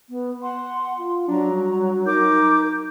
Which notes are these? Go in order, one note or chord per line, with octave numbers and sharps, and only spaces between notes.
B3
F#5 C6
F4
F#3 D4 A#5
G3
D#4 A#4 D6 G6